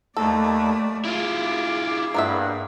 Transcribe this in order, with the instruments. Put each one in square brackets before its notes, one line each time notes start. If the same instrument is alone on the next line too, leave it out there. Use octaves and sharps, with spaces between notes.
[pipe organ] D#2 [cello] A3 D5 [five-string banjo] A4
[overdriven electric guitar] E4 F4 [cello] G#4 [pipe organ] D6
[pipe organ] G2 [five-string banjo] A#3 B3 E5